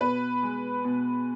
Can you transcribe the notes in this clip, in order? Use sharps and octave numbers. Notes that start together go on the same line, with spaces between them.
B2 B4
G#3
B2